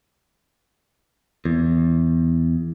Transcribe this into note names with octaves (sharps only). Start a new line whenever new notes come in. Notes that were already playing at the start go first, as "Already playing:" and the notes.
E2